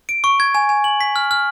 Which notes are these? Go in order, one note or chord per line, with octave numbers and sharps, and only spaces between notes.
D7
C#6
G#6
G#5
G#5
F#7
B6
F6
F6